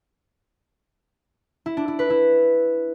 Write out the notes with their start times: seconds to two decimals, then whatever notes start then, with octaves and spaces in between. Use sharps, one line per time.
1.66 E4
1.77 D4
1.88 E4
1.99 B4
2.10 E4